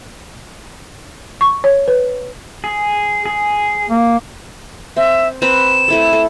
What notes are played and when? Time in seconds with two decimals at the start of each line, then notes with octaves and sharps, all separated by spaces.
1.41 C#6
1.64 C#5
1.88 B4
2.64 G#4
3.26 G#4
3.90 A#3
4.97 C4 E5
5.42 C4 B4 A#5 E7
5.88 A3 E4 A4
6.13 A4